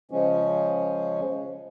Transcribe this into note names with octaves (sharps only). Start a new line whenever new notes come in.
C#3 F3 G#3 C#4